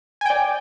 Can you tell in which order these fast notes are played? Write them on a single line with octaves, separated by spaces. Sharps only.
G#5 G5 D5